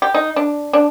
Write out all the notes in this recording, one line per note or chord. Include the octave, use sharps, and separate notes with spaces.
G4
D#4
D4
D4